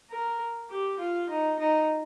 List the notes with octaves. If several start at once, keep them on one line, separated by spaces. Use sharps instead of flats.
A#4
G4
F4
D#4
D#4